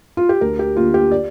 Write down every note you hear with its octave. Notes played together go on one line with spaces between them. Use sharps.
F4
G4
D2 A#4
G4
D3 A#3 F4
G4
D5